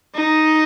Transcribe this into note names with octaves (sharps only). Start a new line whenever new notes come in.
D#4